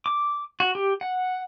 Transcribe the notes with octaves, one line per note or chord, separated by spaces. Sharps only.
D6
F#4
G4
F#5